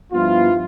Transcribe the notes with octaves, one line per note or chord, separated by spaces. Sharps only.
G2 F3 B3 E4 F4